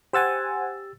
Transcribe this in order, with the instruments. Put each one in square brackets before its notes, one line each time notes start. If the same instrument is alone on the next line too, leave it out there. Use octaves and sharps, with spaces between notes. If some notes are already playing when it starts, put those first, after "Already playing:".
[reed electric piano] G4 E6 A6 [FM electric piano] C5 F#5 G#5